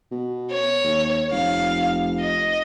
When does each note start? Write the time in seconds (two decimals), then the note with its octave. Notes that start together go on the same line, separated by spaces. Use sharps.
0.12 B2
0.52 C#5
0.84 D#2
1.32 F1 F5
2.21 D#5